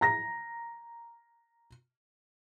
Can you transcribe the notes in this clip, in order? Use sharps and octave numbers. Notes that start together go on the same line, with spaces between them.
A#5 A#6